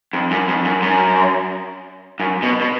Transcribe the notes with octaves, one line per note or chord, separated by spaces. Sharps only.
F2
F#2
F2
F#2
F#2
F#2
B2
B2